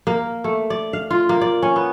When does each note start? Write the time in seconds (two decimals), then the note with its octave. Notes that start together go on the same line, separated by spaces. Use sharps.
0.07 A#3
0.44 A3
0.70 D5
0.93 F5
1.11 F4
1.29 A#3
1.41 D5
1.62 C#4
1.76 B3